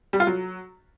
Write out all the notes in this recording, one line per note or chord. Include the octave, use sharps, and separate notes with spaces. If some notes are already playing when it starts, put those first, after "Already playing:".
G3
F4
F#3